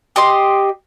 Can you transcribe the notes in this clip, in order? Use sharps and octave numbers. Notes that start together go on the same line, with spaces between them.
G4 D#5 C6